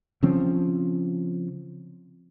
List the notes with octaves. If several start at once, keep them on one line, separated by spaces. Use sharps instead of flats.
C#3 F3 C4 C#4